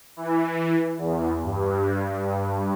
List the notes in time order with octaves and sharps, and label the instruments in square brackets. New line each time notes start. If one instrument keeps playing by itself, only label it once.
[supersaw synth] E3
E2
G2